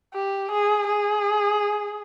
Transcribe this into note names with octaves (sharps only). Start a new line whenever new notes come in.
G4
G#4
G#4